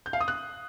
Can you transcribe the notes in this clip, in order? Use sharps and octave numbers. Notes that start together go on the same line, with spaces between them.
G6
F5
D#6
F#6